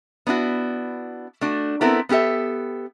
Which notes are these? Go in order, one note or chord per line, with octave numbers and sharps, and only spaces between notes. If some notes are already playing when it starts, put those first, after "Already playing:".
B3 D4 E4 F#4
A3 D4 F#4
B3 C4 E4 A4 A#4
B3 F4 G4 A4 E5